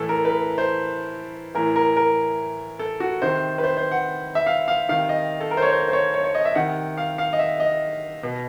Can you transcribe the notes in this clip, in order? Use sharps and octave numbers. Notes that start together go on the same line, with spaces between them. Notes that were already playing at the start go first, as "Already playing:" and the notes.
Already playing: A2 E3 A4
A#4
B4
A#4
C5
A2 E3 A#4
A#4
A#4
A4
F#4
C3 D#3 C5
B4
C5
C5
F#5
E5
F5
F5
C3 D#3 F5
D#5
A4
A#4
C5
C#5
C5
C5
C#5
C#5
C#5
D#5
E5
C3 D#3 F#5
F5
F5
D#5
E5
D#5
B2